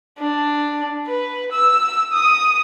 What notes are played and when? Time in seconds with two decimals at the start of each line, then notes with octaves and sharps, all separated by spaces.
0.20 D4
1.07 B4
1.52 E6
2.13 D#6